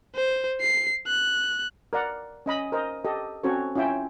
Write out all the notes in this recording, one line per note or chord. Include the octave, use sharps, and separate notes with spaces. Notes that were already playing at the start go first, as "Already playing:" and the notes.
C5
C7
F#6
A#4 D5 F#5
C#4 D#5 B5
A#4 C5 D#5
G4 A4 D#5
C4 C#4 F#4 A4 C5 C#5
C#4 E4 F4 E5 G5